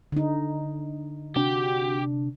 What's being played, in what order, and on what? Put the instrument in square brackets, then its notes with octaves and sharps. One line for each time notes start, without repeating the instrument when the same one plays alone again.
[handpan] D3 D#4
[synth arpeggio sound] C3 D4 [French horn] F#4 [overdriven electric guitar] G4